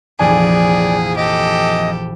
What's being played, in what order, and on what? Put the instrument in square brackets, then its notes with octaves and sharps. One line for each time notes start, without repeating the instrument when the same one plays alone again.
[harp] F1 A#1 E3 [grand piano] F2 G#5 [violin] G#4 [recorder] D5
[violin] G4 A4 [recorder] D#5